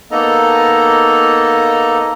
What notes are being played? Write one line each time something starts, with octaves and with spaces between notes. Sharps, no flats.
A#3 B3 D#4 A4 D#5 A#5